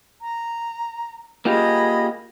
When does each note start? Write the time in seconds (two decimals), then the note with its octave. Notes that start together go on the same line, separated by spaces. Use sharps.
0.21 A#5
1.45 A#3 F4 G4 G#4 D#5 B5